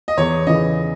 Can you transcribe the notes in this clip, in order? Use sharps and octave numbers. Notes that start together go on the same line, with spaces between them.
D#5
E2 C#5
C#3 E3 D#5